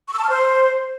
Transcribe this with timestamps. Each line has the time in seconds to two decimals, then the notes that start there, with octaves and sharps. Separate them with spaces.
0.08 C#6
0.13 E6
0.19 A5
0.24 F6
0.29 C5